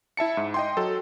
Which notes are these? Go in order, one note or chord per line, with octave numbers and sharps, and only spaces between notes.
E4 E5 A5 C#7
G#2
D#5 G5 C6
F#3 A4